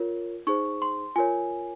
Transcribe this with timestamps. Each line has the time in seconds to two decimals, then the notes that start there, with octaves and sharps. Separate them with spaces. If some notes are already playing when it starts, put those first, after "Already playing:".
Already playing: F4 A#4 C#5
0.47 D#4 G#4 C5 C#6
0.82 C6
1.16 F4 A#4 C#5 G#5